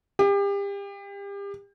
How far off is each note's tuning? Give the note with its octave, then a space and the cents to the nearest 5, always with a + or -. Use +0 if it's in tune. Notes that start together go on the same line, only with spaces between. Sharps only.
G4 +35